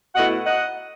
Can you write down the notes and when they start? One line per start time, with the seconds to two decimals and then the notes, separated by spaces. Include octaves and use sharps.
0.15 B2 A3 E4 D#5 F#5
0.45 D#5 F#5